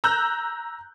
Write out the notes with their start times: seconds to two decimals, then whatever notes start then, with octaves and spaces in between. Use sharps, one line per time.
0.04 A#5 E6 F#6 G6